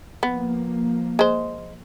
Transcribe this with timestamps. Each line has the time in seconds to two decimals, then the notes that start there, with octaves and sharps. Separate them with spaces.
0.23 F3 A#3 B3
1.19 G#3 C5